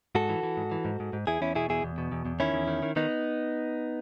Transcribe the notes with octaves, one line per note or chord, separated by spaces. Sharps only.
G#2 F#4 A4
E3
E3
G#2
E3
G#2
G#2
G#2
E2 E4 G#4
E2 C#4 E4
B2 E4 G#4
E2 E4 G#4
E2
B2
E2
E2
D#3 C#4 E4
E2
D#3
D#3
D#3 B3 D#4